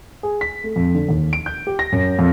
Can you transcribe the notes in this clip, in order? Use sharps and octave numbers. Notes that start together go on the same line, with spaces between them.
G#4
B6
A3
F2
D3
D#2
D7
G6
G4
A#6
F#2
F2